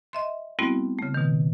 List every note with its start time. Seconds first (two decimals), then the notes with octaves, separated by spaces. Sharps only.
0.13 D#5 E5 C6
0.59 G3 A3 B3 C4 E4 F#4
0.98 C#3 A3
1.14 B2 D#3